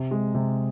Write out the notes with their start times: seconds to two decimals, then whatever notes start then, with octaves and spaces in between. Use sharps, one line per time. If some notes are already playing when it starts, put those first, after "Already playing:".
Already playing: C3
0.11 G#3
0.34 C3